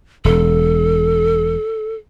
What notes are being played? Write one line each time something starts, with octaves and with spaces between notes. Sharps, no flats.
E1 A4